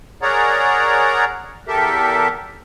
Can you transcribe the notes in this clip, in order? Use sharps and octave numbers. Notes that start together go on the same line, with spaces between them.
G#4 A#4 C#5 D5 F#5 A#5
E2 G4 A4 A#4 E5